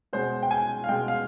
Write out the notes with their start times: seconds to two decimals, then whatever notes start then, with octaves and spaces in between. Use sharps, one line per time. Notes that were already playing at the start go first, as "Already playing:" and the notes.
0.13 B2 G#3 B3 C5
0.43 G5
0.51 G#5
0.84 F5
0.89 B2 G#3 B3 G5
1.08 F5